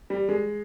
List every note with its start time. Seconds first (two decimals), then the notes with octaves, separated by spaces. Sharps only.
0.10 G3
0.29 G#3